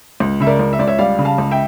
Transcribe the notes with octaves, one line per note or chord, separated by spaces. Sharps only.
C#2
C#3 E5
A#4 D5
C#2
E5
C#2 D5
C#5 E5
G3 D5 F5
C#3
F5 A5
C#2
E5 G5